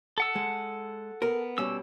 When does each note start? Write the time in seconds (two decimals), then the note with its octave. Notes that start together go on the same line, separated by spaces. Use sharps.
0.18 A4 F#5 E6
0.35 G#3
1.22 B3 A#4
1.58 B2 G3 C#4 E6